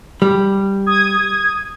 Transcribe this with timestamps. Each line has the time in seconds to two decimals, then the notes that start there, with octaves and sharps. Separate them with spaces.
0.22 G3
0.86 D#6 G#6